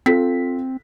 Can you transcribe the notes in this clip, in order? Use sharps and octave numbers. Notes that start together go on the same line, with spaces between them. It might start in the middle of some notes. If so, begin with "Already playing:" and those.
C4 F4 A4 B6